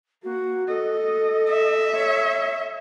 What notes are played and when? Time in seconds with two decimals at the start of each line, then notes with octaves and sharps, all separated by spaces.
0.24 A#3 F#4
0.68 A4 D#5
1.50 E5
1.94 C#5